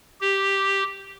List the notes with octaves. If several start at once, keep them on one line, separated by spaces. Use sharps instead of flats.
G4